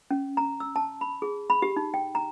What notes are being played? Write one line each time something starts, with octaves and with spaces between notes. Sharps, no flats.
C#4
A#5
E6
A5
B5
G#4
B5
G4
D#4
G5
A#5